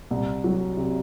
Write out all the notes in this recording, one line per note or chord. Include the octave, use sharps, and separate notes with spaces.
C2
F#3
C3